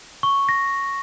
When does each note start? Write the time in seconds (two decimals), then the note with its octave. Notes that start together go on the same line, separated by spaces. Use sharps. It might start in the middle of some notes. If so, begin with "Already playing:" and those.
0.23 C#6
0.49 A#6